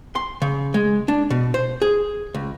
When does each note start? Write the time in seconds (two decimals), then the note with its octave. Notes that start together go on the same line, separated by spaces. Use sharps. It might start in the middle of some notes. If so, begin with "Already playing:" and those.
0.15 C6
0.42 C#3
0.74 G#3
1.08 D4
1.30 B2
1.54 C5
1.82 G#4
2.34 C#2